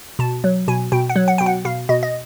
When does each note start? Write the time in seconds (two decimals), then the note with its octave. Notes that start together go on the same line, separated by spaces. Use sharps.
0.19 B2 A5
0.44 F#3
0.68 B2 G#5
0.92 B2 G5
1.10 F#5
1.16 F#3
1.28 F#5
1.38 B2 G5
1.46 F#5
1.65 B2 F5
1.89 B2 D#5
2.03 D#5